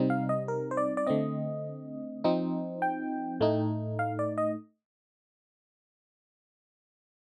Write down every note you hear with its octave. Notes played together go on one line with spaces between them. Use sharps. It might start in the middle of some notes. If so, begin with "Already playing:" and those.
Already playing: C3 G3 C4 D#4
F5
D#5
A#4
C5
D5
D5
D3 A3 C4 D#5
F3 C4 D#4
G5
A2 A3 D#4
F5
D5
D#5